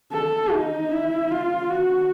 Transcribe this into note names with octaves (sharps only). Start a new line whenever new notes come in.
A4
D#4
E4
F4
F#4